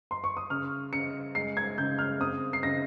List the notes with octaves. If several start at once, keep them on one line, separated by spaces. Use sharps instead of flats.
C6
C#6
D#6
C#3 F6
C#3 C#7
G#3 C7
G#6
C#3 G6
F6
C4 D#6
C7
C#3 A#6